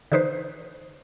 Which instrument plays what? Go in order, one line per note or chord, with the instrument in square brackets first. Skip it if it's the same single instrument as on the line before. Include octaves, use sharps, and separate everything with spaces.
[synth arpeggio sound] D3 E3 D#4 B4 C5